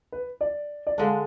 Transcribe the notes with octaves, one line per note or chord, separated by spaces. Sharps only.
B4
D5
D5
D3 G#3 D4 F5